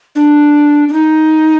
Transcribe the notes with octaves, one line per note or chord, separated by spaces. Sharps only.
D4
D4
D#4